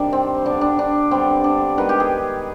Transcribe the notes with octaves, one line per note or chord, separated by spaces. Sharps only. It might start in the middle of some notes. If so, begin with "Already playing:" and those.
Already playing: C3 D#3 G3 D4
C4
D3 G3 B3 D4
D4
D4
D3 G3 B3 C4
D4
D#3 G#3 B3 B4
G4
G#4